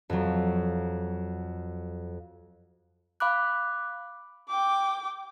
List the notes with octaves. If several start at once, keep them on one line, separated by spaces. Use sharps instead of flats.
F2 F#3
F5 B5 D6 F#6
G5 D6